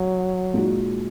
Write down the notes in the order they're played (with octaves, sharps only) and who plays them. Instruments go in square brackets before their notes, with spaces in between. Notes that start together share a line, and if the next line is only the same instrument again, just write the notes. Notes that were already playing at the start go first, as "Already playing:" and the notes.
Already playing: [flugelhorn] F#3
[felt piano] A#2 G#3 D#4 F#4